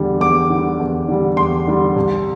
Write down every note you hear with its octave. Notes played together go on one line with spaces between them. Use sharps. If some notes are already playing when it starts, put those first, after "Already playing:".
Already playing: E2 D3 G3
E2 D6
D3 G3
E2
D3 G3
E2 C6
D3 G3
C2